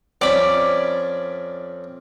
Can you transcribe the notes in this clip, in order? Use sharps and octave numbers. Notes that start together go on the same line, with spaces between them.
F2 C#4 D5 B5